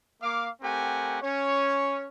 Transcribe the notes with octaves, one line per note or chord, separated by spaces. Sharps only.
A#3 F5 D6
A3 C4 G4 A#4 F#5 G#5
C#4 C#5